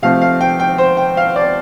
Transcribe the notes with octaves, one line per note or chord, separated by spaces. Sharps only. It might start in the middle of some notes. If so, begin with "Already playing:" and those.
C3 F3 A3 F5
F5
G5
G5
C5
G5
F5
D5